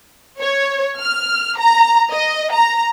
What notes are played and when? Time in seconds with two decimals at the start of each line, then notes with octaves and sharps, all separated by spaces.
0.39 C#5
0.98 F6
1.58 A#5
2.11 D#5
2.52 A#5